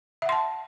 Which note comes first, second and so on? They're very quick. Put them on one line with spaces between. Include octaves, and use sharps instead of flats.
E5 F#5 C6 A5